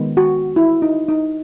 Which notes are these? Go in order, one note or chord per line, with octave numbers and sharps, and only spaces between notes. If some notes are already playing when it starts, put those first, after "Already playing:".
Already playing: D#3 G#3 B3
F#4
E4
D#4
D#4